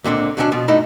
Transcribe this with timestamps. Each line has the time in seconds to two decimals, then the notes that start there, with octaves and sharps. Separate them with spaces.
0.04 C#2 A#2 D3 C4
0.37 D#2 D3 F#3 A#3 C#4 D4
0.52 B2 F3
0.68 G2 A3 D#4 E4